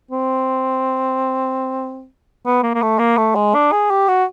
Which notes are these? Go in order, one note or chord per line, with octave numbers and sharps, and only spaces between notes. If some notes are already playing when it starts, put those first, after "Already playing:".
C4
B3
A#3
A#3
A3
A#3
A3
G#3
D4
G#4
G4
F#4